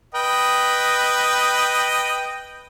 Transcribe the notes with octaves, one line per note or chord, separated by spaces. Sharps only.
B4 D#5 G5